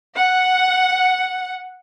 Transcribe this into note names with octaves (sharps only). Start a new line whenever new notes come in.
F#5